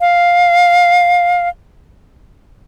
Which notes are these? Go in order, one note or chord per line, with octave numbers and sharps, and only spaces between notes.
F5